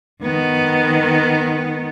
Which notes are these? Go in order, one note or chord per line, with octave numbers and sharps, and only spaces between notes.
D#3 B3